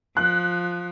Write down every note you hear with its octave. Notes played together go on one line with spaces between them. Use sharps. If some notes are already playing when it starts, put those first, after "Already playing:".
F3 F#6